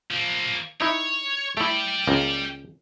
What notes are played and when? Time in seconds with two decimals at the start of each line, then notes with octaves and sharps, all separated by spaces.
0.11 F3 A#3
0.81 D#4 E4 C#5
1.57 A3 E4 G4 D5
2.07 C#2 A#3